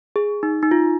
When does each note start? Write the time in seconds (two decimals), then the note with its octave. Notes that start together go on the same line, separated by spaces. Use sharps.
0.16 G#4
0.43 D#4
0.63 D#4
0.71 F4